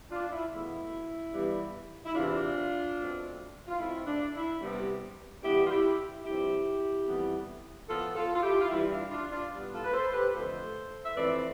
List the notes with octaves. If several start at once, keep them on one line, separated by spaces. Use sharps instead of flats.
D4 F4
E4
E2 B2 A3 E4
G2 E3 G3 B3
E4
E2 C3 E3 D4 F4
B2 A3 C4
F4
B2 A3 C4 E4
D4
E4
C3 G3 B3
G2 E3 B3 E4 G4
F4
E4 G4
G2 F3 C4 E4 G4
F2 E3 G3 B3
A2 F3 B3 F4 A4
F4 A4
F4
E4 G4
F4
G2 E3 G3 E4
D4 F4
D4 F4
D4 F4
A2 G3 B3
F4 A4
B4
A4 C5
G4 B4
F2 D3 F3 A3 A4 C5
E5
F2 E3 A3 C4 B4 D5